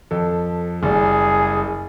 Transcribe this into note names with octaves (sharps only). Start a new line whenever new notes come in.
F2 A4
F#1 G3 G#4